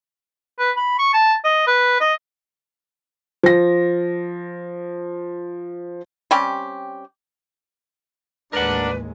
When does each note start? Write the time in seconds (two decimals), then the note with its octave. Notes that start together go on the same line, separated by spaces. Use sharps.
0.59 B4
0.77 B5
0.99 C#6
1.14 A5
1.44 D#5
1.67 B4
2.01 D#5
3.43 F3 A#6
6.31 G3 C4 C#4 G4
8.53 A1 D#2 G#3 D4 A#4 B4 F#5